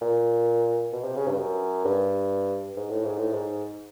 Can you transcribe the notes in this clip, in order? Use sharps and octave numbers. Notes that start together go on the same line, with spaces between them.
A#2
B2
C3
C#3
G2
F#2
G2
G#2
A2
G#2
A2
G#2